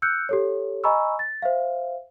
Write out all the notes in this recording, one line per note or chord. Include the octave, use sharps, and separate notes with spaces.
E6 F#6 G6 C#7
G4 A4 C#5
D#5 G#5 A#5 B5 C#6 E6
A6
C5 E5 F5